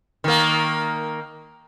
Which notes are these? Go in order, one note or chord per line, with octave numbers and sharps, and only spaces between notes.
D#3 A#3